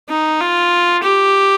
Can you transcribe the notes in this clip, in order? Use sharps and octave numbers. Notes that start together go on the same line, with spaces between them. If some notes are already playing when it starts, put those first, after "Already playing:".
D#4
F4
G4